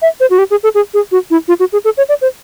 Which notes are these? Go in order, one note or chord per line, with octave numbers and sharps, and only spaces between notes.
E5
C5
F#4
G4
G#4
A4
G#4
G#4
F#4
E4
F4
F#4
G#4
A4
C#5
D5
C5